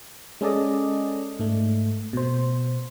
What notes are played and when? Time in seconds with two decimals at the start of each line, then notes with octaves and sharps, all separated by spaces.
0.41 G#3 C#4 G#4 A4 D5 D#5
1.39 G#2 A3
2.13 B2 C5